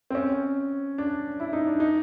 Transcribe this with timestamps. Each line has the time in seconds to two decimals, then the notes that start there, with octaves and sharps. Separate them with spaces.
0.10 C4
0.15 C#4
0.98 D4
1.40 E4
1.53 D#4
1.67 D4
1.80 D#4